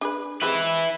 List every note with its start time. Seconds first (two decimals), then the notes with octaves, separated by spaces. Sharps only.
0.01 D4 G#4 B4
0.42 G#3 C4 E4 G4 B4